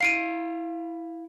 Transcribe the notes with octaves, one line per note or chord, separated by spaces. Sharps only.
E4 F5 C7 D7 D#7